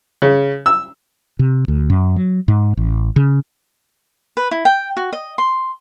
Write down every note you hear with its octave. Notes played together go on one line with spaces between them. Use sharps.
C#3
E6
C3
D2
F#2
F#3
G#2
A1
C#3
B4
E4
G5
F#4
D#5
C6